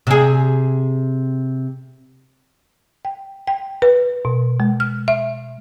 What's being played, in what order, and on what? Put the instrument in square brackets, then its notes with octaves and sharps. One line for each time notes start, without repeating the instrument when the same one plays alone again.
[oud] C3 G#4
[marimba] G5
G5
B4
B2
G#3
F6
E5